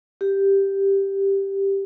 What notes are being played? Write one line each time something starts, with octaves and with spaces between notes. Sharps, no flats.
G4